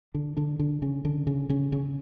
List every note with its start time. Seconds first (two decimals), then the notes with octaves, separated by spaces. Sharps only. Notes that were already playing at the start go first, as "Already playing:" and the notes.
0.14 D3 D4
0.37 D3 D4
0.59 D3 D4
0.82 C#3 C#4
1.05 D3 D4
1.27 C#3 C#4
1.49 C#3 C#4
1.72 C#3 C#4